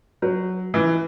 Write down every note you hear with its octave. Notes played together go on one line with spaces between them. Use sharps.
F#3
E3